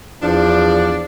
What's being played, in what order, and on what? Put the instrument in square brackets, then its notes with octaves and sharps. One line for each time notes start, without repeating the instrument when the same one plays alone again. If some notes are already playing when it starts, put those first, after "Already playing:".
[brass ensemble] E2 [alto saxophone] F3 [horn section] D4